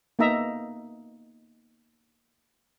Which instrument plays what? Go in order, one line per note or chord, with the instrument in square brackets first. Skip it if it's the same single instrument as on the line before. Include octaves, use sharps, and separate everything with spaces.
[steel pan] A#3 B3 D#4 D#5 E5 A#5